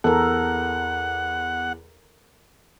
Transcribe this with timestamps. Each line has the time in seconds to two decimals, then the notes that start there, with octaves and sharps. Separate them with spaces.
0.04 E2 A4 A#4 F#5